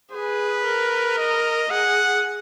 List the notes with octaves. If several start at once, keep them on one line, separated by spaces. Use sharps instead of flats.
G#4 B4
A#4
D#5
G#4 F#5